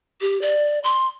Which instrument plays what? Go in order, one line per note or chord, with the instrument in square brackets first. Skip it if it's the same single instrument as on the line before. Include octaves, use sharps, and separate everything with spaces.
[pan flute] G4
D5
C6